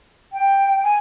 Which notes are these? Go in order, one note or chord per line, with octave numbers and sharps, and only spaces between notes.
G5
G#5